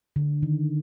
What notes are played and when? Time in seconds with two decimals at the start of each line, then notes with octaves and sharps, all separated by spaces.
0.16 D3
0.43 D#3